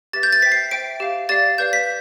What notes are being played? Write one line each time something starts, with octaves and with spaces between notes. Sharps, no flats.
G4 B4 E5 A6
G6
A6
C5 E5 G5 B6
C7
C5 E5 G5 D7
G4 C5 F5
G4 D5 F5 A6
G4 B4 D5 F5 G6
B6